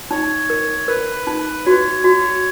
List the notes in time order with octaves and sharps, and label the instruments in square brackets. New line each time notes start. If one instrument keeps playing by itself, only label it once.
[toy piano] D#4 [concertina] C#5
[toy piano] A#4
[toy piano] A#4 [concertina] B4
[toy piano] D#4
[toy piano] F#4 [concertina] C#5
[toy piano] F#4